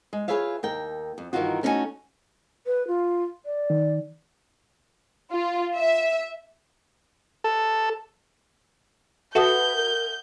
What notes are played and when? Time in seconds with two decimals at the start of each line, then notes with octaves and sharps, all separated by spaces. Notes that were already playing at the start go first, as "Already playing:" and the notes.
0.13 G#3
0.28 F4 G#4 B4 C#5 E5 F5
0.63 D#2 A#4 G5
1.18 F2
1.33 G2 D#3 E3 D#4 F4 F#4
1.63 A3 C#4 D#4 E4 F#4 G#5
2.66 B4
2.87 F4
3.46 D5
3.70 D#3
5.31 F4
5.75 E5
7.44 A4
9.35 F#4 A4 B4 E5 F#5 D#6 G6
9.76 A#4